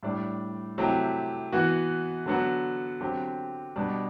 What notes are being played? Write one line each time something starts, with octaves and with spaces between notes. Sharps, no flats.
A2 G3 D4
C3 F#3 A3 E4 G4
E3 B3 F#4
D3 F#3 B3 F#4
D3 F#3 C4 G4
B2 G3 D4